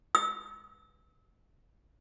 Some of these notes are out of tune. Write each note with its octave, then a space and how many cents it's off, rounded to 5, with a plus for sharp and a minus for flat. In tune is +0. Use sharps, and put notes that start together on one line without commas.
E6 -30